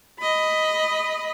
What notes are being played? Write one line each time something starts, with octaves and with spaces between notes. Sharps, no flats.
D#5 B5